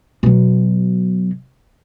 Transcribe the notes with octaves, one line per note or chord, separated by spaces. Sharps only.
B2 F#3